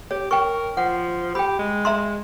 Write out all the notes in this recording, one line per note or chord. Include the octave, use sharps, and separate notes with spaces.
G4 C#5
A#4 G5 C#6
F3 F#5
G4 G5 B5
G#3
E5 A#5 C6